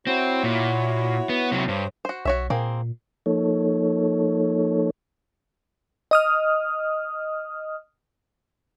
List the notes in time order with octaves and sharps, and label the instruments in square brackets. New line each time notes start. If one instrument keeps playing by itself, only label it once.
[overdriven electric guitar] C4 [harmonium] E4 F#4 C#5
[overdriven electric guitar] A#2
B3
C3 F#3
[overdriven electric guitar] G2 [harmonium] C5 C#5
[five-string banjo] F#4 C5
[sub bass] B1 [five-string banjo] F#4 C#5 E5
[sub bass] A#2 [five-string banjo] A#3 C4 G#4
[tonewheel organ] F3 A#3 D#4 A4 C#5
[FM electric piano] D#5 D#6 F6